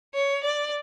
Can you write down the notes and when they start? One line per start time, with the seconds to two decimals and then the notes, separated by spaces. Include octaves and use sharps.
0.14 C#5
0.44 D5